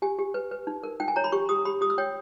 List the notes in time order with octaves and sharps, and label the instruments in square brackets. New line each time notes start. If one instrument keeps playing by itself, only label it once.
[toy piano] G4 G#5
G4
B4
B4
D#4
A#4
D#4 G5
G#5
C#5 A#5
B5
G4 C#6
G4 D#6
G4 B5
G4 D#6
E6
C#5 G5